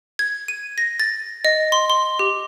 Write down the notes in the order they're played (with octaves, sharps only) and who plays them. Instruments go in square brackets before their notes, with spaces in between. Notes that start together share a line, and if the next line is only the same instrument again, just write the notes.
[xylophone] G#6
D#7
A#6
A6
D#5
C6
C6
G4